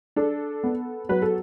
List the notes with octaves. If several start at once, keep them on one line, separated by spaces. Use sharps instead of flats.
D4 A4
B3
F#3 B4
A4